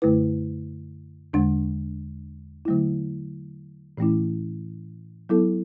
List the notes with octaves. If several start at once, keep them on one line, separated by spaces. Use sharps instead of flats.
F#2 D3 A3 E4 B4
E2 D3 G#3 D4
D3 F#3 A3 E4
A2 E3 A3 C#4 E4
F#3 B3 E4 A4